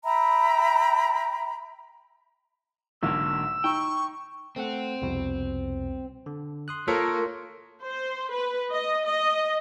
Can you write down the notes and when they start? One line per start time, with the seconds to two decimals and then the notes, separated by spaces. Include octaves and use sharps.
0.04 E5 G5 A#5 B5
3.03 B1 G#2 D3 F#3 A#3 E6
3.64 D#4 G5 C#6
4.56 A3 C4 A4 F#5
5.02 C2 F2 B2
6.26 D3
6.68 C6 D#6 F#6
6.88 A#3 F4 A4 A#4 C#5
7.82 C5
8.32 B4
8.71 D#5
9.06 D#5